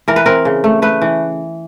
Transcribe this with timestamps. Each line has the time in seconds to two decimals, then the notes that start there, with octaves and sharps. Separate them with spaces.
0.08 E3 A#4
0.16 B4
0.26 C4 A#4
0.45 C#3
0.64 A3
0.82 A3 B4
1.02 E3